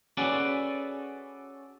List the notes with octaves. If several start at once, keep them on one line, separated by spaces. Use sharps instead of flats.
C#4 F#4 G#4 A4 B4 D5